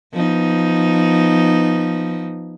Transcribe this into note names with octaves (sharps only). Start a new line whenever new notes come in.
F3 B3 D#4